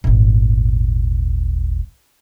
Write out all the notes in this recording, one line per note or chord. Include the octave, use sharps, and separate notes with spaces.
D#1 G#1